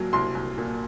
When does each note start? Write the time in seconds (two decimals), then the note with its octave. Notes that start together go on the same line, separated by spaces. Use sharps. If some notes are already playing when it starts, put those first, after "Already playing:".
Already playing: C2 A#2 F#3
0.13 C2 C6
0.35 C2
0.58 A#2